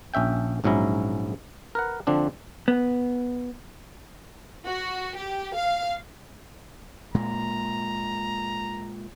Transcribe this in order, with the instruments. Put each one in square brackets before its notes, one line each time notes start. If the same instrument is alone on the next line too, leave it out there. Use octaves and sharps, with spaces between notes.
[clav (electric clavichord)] A#1 C#4 E5 G5
A#1 G#2 F#3 C#4 E4 A#5
A#4 B4 F#5
D3 F3 C4 D4
[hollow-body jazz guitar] B3
[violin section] F#4
G4
F5
[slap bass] A#2 G#3 A#3 [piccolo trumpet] A#5